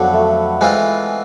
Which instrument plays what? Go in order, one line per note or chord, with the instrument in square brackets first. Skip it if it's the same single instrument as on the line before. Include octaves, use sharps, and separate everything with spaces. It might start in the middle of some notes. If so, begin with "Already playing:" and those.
Already playing: [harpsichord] F2 D3 F#3 [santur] B3
[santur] A3
[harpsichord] E3 G#3 C4 F4